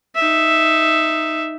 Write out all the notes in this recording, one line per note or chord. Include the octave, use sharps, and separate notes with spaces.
D#4 E5